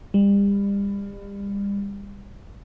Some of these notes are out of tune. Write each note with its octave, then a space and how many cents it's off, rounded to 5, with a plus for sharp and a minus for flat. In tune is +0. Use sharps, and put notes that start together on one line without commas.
G3 +35